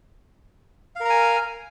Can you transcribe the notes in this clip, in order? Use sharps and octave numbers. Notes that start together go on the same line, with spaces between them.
A#4 F5 G#5 A#5